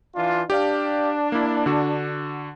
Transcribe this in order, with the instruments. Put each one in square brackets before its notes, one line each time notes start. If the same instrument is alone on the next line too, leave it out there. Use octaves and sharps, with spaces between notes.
[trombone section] E3 D4 F4
[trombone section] D4 [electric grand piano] G4 D5 F5
[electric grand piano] A#3 E4
D3 F#4